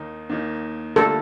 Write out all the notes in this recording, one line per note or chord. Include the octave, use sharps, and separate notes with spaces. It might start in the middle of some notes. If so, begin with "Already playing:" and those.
Already playing: D#2 D#3 A#3 D#4
D#2 D#3 A#3 D#4
D2 D3 G3 A#3 F4 A4